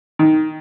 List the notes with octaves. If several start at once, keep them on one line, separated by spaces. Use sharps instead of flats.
D#3